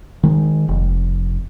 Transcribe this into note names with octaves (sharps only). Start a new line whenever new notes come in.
D#3 G#3
F1